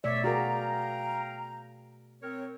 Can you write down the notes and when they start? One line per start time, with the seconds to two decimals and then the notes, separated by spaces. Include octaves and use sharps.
0.04 B2 A3 C#5 D5 E5
0.24 F#4 G#4 A#4 F5 G5 A#5
2.22 C4 A#4 C#5